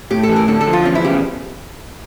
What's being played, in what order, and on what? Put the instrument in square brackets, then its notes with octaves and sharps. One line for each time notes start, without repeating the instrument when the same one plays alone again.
[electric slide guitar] A2 [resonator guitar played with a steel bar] G4
[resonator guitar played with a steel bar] A4
[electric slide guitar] E3
[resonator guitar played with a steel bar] A#4
[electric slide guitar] D3 [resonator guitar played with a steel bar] A4
[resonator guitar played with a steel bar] A4
[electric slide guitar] F3
[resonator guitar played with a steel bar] F4
[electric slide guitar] E2 [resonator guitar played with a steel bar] C#4
[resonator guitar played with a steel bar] E4
[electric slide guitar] C#3 [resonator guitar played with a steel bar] G4